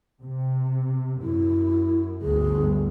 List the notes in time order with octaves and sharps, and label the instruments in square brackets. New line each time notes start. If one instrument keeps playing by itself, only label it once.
[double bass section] C3
[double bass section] F#2 [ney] E4
[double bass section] G1 D2 G2 [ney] G#4